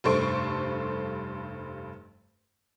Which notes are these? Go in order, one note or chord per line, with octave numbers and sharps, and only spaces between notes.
F1 G2 A4 C5 C#6 D7